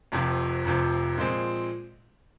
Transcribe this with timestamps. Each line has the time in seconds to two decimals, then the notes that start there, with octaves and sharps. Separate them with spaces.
0.12 F1 F2 C3 F3
0.65 F1 F2 C3 F3
1.18 A#2 F3 G#3 C4